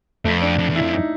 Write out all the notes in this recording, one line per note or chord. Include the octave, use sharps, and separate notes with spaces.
F2 A3
D4
F2
E2
E4
F2
D#4